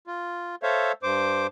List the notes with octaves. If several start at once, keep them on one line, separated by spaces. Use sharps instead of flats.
F4
A4 C5 C#5 E5 F5
G2 C5 D6